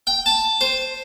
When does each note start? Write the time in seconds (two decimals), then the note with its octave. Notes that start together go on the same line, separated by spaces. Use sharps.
0.07 G5
0.26 A5
0.61 C5